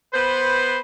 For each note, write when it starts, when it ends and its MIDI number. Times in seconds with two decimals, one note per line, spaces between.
0.14 0.79 59
0.14 0.79 71
0.14 0.79 72